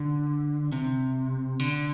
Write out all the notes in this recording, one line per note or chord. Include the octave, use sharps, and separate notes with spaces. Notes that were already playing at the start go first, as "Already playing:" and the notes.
Already playing: D3
C3
D3